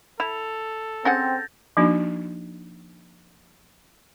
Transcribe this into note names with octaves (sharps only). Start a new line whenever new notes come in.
E4 A4 F7
C4 C#4 G#4 F#5 G6 A6 A#6
F3 A#3 D4 D#4 F#4